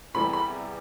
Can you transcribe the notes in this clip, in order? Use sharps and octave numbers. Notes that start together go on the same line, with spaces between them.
E2 C3 E3 G3 B5
B5